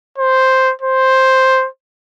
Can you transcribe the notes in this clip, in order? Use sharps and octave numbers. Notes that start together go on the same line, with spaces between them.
C5
C5